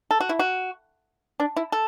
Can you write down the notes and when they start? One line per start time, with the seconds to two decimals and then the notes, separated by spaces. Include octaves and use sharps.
0.11 A4
0.20 F#4
0.29 E4
0.39 F#4
1.40 D4
1.56 E4
1.72 A4